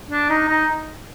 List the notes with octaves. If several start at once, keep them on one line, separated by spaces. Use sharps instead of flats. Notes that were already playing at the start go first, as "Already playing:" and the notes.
D4
D#4
D#4